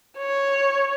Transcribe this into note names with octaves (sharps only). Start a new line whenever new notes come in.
C#5